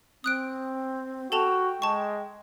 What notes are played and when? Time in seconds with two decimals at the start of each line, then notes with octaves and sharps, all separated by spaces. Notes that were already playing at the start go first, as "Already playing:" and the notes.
0.24 C4 D#6 F#6 D7
1.32 F#4 A4 G5 A5 F7
1.82 G#3 A5 C#6